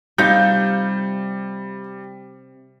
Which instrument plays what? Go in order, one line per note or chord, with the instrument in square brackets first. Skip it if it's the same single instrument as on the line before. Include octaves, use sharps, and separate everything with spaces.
[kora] C3 [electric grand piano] G3 [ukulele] D#4 F4 F5 [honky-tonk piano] G6